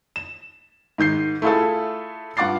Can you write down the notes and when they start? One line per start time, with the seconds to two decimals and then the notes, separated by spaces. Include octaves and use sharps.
0.16 E7
0.98 G#2 D#3 G6 C7
1.42 A3 E4 F4 G#4 A4
2.37 G2 F4 F#5 D6 A6 C7